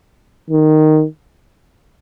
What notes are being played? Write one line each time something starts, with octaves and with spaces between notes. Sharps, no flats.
D#3